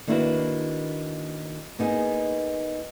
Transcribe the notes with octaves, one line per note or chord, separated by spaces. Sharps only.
D#3 A#3 D4 E4 F#4 B4
A#3 B3 D#4 G#4